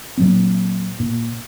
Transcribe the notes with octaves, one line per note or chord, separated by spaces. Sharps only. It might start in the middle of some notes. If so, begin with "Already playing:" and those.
A#2 F#3 C4
A#2